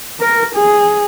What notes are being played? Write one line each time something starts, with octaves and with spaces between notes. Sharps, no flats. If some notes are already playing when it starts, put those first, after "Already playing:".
A#4
G#4